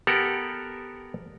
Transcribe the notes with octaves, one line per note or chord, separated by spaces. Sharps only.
B3 G4 A4 A#4 F#5